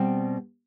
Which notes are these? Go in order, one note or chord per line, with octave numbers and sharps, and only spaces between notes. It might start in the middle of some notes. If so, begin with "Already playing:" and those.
Already playing: B2 G3 C4